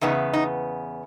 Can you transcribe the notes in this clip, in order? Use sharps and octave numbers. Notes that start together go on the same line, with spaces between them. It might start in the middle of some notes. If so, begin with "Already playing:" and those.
E2 C#3 B3 D#4
D#4